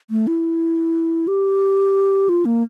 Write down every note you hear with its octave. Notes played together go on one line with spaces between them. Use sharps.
A3
E4
G4
F4
A#3